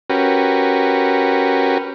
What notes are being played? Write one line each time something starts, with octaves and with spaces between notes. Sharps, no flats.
C#4 F#4 G4 A#4 B4